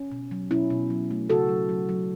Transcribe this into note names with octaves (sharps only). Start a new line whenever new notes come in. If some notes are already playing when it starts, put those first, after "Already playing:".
Already playing: C#4
B2
F#3
B2 C#4 E4
B2
F#3
A3
C#3 F#4 A4
F#3
F#3
F#3